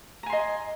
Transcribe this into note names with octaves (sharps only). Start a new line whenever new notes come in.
D#5 G#5 A#5 C6